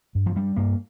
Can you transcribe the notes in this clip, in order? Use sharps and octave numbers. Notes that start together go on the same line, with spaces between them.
G2
F3
G2 G3
G2 A#3